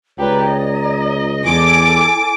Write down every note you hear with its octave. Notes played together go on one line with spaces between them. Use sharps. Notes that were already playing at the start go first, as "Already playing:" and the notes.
C#2 G4 B4 C#5 D5 A#5
D#5
E2 E4 A4 G#5 D6